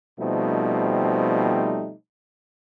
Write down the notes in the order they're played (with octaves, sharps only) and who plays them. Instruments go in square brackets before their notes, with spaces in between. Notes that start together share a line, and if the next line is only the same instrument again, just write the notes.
[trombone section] B2 F3 G3 A3 C4 D#4